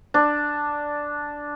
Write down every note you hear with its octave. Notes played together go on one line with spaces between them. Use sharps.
D4